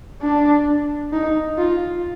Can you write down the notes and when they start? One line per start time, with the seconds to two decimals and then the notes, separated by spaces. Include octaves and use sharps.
0.22 D4
1.13 D#4
1.58 F4